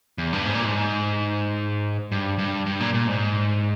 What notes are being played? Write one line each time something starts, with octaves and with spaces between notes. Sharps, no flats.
E2
G2
G#2
A#2
G#2
G2
G2
G2
A#2
A#2
G#2